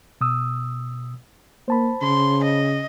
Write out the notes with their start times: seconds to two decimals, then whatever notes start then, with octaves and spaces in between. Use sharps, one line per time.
0.21 B2 D#6 E6
1.68 A#3 C5 A5 B5
2.02 C#3 C6
2.44 D#5